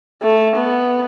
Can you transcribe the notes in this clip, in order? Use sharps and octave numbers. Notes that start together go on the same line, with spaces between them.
A3
B3